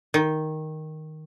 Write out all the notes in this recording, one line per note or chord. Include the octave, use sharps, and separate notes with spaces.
D#3